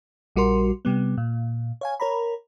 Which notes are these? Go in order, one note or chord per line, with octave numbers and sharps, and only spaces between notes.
A#1 G3 F#4 A#4 C6
C3 G3 B3
A#2
C#5 F5 G#5
A#4 C#5 A#5 B5